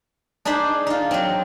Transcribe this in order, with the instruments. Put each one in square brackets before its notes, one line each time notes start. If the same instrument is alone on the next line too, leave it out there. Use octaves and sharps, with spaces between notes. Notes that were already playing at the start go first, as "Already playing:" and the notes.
[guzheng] D4 D#4 G#4 C5 B5
D#4 F4
F#3 C4